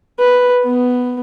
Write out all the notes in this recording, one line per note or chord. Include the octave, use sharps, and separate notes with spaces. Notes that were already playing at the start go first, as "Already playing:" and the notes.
B4
B3